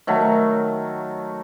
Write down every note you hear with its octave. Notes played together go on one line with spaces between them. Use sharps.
D#3 F#3 A3